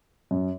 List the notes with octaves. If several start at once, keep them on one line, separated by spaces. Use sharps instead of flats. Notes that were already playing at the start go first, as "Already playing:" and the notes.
F#2